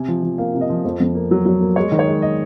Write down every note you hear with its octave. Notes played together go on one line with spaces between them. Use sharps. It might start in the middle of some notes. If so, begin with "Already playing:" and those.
Already playing: C3 G#5
F3
F3
A#3 F5
C3
D#5
F3
F2 C5
F2
A#3
F#3
F#3
A#3
G#3 C#5
D#3
C#5
G#3
D#5